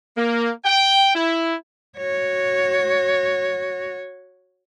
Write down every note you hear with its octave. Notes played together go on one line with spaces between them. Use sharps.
A#3
G5
E4
F#4 C#5